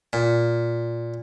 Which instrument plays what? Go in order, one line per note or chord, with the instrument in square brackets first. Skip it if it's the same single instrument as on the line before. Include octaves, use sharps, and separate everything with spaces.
[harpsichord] A#2